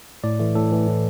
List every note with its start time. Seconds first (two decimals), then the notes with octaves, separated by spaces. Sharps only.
0.24 A2 D5
0.40 E3 A3
0.55 A2 A4
0.72 E3 A3
0.88 A2